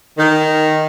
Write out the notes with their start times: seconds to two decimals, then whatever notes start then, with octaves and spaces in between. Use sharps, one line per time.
0.18 D#3